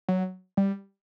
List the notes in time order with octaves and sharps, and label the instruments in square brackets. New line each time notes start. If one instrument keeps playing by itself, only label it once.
[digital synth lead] F#3
G3